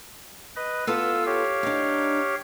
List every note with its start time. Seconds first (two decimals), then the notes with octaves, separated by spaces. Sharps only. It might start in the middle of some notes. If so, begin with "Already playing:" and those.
0.56 B4 D#5
0.87 B3 F4 A4 F5 E6
1.26 G4 C#5 F5
1.63 D4 D#4